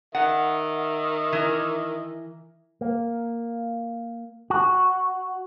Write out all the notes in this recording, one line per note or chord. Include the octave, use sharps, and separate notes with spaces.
D#3 E5 F#5
E3 A#4
A#3
F#4